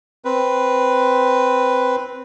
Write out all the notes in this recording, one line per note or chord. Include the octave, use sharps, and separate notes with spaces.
C4 B4